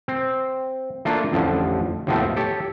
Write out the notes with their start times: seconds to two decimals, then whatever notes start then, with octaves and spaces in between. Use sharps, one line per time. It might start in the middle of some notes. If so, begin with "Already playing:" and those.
0.08 C4
1.05 A3 A#3 D4 F4
1.32 A1 F2 D3 F3
2.07 D#2 A2 F3 A3 B3 C4
2.36 G4 A4 C#5